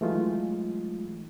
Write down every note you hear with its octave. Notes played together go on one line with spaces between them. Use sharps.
E3 F#3 G#3 A3 D#4 F4